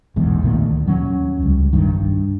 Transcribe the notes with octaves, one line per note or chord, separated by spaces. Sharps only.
D#1 B1 E2 G#2
D2 A#2 D#3 A3
D#2 F#3 A3 C#4
C#2 G3
E1 B1 G2 D#3
G2